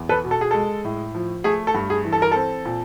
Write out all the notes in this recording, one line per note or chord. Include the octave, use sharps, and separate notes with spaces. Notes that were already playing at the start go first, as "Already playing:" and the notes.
Already playing: E2
A4 B4
B2
A4
G#4
G#3 A4
A2
F3
A3 G#4
A4
G2
G#4
E3
A4
A#4
C4 A4
A#2